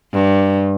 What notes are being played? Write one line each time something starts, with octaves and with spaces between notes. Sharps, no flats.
G2